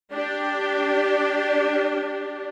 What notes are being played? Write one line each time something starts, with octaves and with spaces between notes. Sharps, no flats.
D4 G4